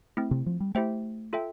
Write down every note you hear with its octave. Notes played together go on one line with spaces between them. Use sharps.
A3 C4 E4
C3
F3
G3
A3 E4 G4 C5 E5 G5
F4 A4 E5 G5